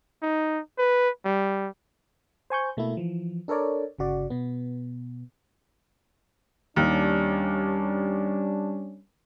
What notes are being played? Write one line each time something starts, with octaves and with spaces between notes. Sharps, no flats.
D#4
B4
G3
C5 G#5 C#6 G6
B2 A3 A#3 E4
E3 F3
D4 A4 A#4 C#5 D5
G1 C#3 F#4 D5
B2 B3
D#2 G3 C#4 D4